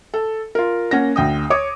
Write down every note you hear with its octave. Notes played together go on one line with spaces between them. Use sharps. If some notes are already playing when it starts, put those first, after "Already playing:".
A4
F4 A#4
A#3 C#4 F#5 A#6
D2 G5 D#6
C#5 D6 D#6